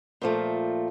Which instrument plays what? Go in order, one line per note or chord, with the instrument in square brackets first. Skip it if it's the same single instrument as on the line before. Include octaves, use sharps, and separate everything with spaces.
[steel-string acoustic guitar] A#2 F3 A3